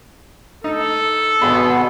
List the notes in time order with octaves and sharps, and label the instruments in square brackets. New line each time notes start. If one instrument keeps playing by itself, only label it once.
[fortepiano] D#4 [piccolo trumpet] A4
[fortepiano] G#1 G#4 B5 [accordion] B2 B3